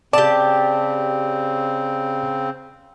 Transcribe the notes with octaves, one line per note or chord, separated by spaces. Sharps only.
C#3 C4 G4 D5 A5